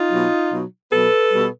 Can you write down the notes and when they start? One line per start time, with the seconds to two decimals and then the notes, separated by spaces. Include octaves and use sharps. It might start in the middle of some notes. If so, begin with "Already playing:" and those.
Already playing: D#4 F4
0.12 B2 F#3
0.52 B2 F#3
0.91 B2 F#3 A4 B4
1.32 B2 G3